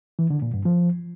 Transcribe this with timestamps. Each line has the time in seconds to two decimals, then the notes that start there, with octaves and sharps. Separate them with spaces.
0.19 E3
0.30 D3
0.42 A#2
0.54 G2
0.65 F3